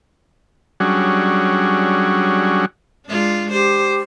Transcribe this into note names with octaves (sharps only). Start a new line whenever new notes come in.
F#3 G3 C#4 D4 F#4 G#4
G#3 D4 F4
G4 C5